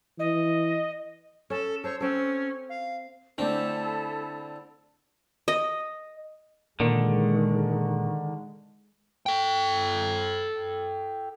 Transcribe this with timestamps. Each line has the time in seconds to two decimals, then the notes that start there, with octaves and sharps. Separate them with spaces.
0.19 E3 D#5
1.50 C#4 A4
1.84 A4 C5 C#5
2.01 C4 C#4 A4
2.69 F5
3.38 D3 A3 C4 D4 E4 A4
5.48 D#5
6.80 A#2 D3 D#3 G#3
9.26 A4 G5